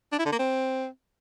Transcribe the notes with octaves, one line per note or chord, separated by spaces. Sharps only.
D4
E4
D3
A#3
C4